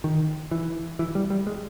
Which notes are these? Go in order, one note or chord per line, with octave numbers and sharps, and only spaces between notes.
D#3
E3
E3
G3
G3
G#3